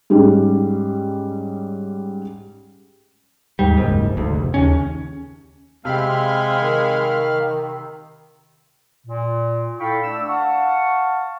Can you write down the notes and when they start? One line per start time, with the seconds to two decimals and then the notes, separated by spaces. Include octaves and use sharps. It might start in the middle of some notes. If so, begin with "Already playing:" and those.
0.10 G#2 G3 C#4
3.59 D#2 G#2 G3
3.77 F#1 D#2 G#2
4.17 G#1 D2
4.36 F1
4.54 D#2 C#3 C#4
5.85 C3 G#3 C4 G4 F5 B5 F6
6.61 D#3
9.06 A#2
9.80 E4 A4 F5 G5 B5 C#6
10.03 A3 D4 D5 E6
10.28 F5 F#5 A5 C#6